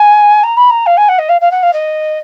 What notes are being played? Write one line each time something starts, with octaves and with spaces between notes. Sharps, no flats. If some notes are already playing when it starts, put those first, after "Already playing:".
Already playing: G#5
A#5
B5
A#5
F5
G#5
F#5
D#5
F5
F5
F#5
F5
D#5